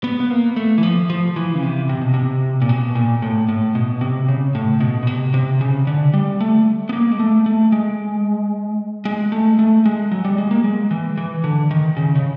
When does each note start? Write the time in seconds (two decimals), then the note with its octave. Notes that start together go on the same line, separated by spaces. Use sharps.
0.04 B3
0.20 B3
0.30 A#3
0.56 A3
0.78 E3
0.83 F3
1.10 F3
1.36 E3
1.55 C#3
1.62 C3
1.89 C3
2.01 B2
2.14 C3
2.62 A#2
2.69 B2
2.95 A#2
3.22 A2
3.49 A2
3.75 B2
4.01 C3
4.28 C#3
4.55 A2
4.81 B2
5.03 B2
5.07 C3
5.34 C3
5.61 C#3
5.87 D3
6.14 G3
6.41 A3
6.89 B3
6.93 A#3
7.11 G#3
7.20 A3
7.46 A3
7.72 G#3
9.05 G#3
9.32 A3
9.59 A3
9.85 G#3
10.12 F#3
10.25 G3
10.38 G#3
10.51 A#3
10.64 G#3
10.91 E3
11.17 E3
11.44 D3
11.71 D#3
11.97 C#3
12.15 C#3